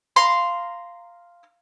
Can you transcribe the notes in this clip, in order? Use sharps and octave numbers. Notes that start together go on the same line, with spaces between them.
F5 A#5 C6